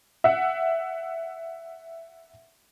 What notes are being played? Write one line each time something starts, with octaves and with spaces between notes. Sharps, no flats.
E5 F#5